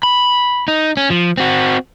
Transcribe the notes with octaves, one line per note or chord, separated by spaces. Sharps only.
B5
D#4
C#4
F3
C4 F#4